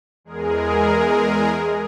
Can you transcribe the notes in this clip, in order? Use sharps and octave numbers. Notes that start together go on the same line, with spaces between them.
E2 G#3 G#4 A#4